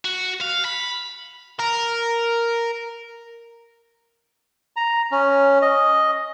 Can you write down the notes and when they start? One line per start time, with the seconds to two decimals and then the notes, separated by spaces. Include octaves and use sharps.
0.05 F#4
0.41 F5
0.65 B5
1.59 A#4
4.76 A#5
5.11 C#4
5.62 D#5